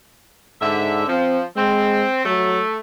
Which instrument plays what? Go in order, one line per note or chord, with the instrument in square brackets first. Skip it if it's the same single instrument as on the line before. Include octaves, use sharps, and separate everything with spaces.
[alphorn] G#2 [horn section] D3 E5
[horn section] F3 [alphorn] C4
[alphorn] G#3 [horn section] C4
[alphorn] F#3 [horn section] A3